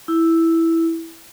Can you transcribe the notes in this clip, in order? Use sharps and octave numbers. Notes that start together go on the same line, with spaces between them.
E4